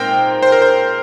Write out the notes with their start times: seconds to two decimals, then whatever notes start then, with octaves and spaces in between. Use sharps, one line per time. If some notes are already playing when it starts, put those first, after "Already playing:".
Already playing: A#2 G#3 C4 D#4 A#4 C5 G5
0.42 C5
0.52 A#4
0.62 C5